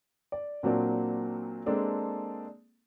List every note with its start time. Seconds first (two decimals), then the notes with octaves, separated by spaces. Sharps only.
0.32 D5
0.63 A#2 F#3 A#3 C4 D4
1.66 G#3 A#3 C4 D4 A4